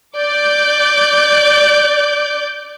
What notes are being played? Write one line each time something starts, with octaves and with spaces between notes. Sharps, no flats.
D5 D6 G6